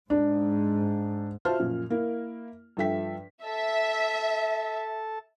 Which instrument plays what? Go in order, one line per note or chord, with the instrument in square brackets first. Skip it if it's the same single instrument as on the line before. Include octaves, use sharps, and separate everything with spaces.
[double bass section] G#2 [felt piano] D4
[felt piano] F4 F#4 C5 E5 A5 F6
F#2 A#2 F3
A#3 E4 A#4
G2 F3 A4 E5 G5 B6
[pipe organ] A4 A5 [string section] E5